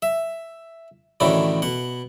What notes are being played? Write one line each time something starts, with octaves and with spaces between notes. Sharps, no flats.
E5
A1 A2 D3 D#3 E4 F#4
B2 F#5